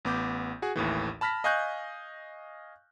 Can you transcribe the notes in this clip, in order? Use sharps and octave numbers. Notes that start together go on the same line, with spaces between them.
A1 B3 D6 G6
F#4 G#4
A1 D#2 A2 E3
A5 B5 F6 A#6 B6
D#5 F5 G#5 C#6 F#6 G6